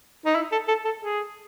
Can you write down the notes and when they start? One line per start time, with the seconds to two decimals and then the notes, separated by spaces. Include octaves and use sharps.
0.25 D#4
0.35 E4
0.52 A4
0.68 A4
0.85 A4
1.02 G#4